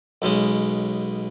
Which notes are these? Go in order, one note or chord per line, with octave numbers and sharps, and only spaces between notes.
B1 B2 G#3 C#4